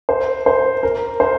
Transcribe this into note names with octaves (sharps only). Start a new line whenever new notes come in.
C5
C5
A#4
C5